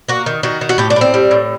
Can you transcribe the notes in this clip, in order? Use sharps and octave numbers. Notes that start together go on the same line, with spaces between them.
A#3 F#4
D#3
D#3 F#4
D#3
F#4
A2 G4
D4
A2 C4
G3
A2